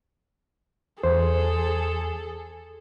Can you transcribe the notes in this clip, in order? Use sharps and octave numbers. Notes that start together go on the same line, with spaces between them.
E2 G#4 A4 C5